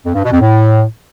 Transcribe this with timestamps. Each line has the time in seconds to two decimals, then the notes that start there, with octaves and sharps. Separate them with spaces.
0.05 F2
0.14 G2
0.23 B2
0.32 F2
0.40 A2